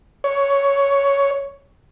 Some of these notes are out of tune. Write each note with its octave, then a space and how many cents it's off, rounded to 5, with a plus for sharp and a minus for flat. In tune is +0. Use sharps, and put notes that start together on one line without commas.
C#5 +5